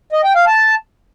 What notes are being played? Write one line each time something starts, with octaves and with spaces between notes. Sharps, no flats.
D#5
G5
F5
A5